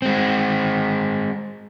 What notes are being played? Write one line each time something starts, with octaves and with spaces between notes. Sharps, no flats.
G#3 C4